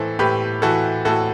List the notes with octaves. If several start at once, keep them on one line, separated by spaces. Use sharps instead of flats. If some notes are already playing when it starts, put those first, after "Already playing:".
Already playing: A2 E3 A4 C5
A2 G4 B4
E3 F#4 A4
A2 F#4 A4